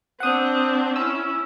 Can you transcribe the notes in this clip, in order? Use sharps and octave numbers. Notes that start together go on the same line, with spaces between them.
C4 D4 F#5 D#6
C#4 E4 E6